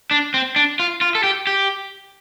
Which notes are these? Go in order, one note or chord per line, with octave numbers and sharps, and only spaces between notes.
D4
C4
D4
F4
F4
A4
G4
G4